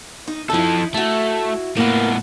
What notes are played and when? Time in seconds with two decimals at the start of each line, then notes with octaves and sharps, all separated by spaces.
0.28 D#4
0.50 F3 D#4 E4 A4
0.94 A3 E4 F#4
1.77 A2 A#3 B3 B4